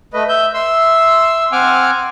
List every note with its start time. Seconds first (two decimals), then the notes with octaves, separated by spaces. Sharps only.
0.14 A3 B4 D#5
0.29 E5 G6
0.54 E5 C6 E6
1.52 C4 F#5 G#5 D6 F6